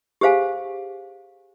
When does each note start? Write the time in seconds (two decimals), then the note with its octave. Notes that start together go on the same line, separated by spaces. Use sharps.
0.21 G4 G#4 C5 F5 G#5